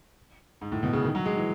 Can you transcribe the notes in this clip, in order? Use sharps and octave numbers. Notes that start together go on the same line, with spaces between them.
G#2
A2
B2
C#3
D#3
F#3
G#3
E3